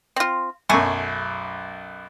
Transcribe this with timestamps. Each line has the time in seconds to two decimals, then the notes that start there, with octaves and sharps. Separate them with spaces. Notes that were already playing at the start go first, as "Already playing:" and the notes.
0.16 C4 F4
0.69 B1 F#2 A3 G#5 C#6